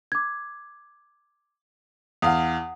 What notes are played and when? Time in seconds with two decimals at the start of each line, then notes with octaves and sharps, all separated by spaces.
0.12 D6 G#6
2.22 E2 F5 F#5 D#6